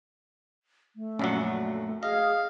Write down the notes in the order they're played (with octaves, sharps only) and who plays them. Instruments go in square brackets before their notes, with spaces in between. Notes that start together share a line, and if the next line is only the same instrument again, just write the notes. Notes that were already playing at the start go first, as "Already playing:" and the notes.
[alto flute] A3
[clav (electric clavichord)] A#1 F#2 F#3 [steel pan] C#4 D5 F#5
[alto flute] G#4 [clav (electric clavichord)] D#5 [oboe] F5